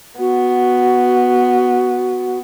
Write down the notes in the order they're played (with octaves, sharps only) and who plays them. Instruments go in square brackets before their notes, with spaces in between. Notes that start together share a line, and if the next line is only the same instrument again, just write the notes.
[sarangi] B3 [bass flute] F#4